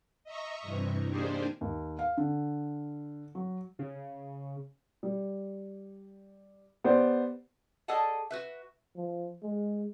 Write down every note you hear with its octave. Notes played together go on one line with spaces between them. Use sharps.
D#5 E5 A#5 C#6
G2 C3 E3
A#3 D4 D#4 G4 G#4 C5
D#2
F5
D3
F#3
C#3
G3
B3 G4 C5 D5
G#4 A4 D5 D#5 F#5 A5
F#4 B4 E5
F3
G#3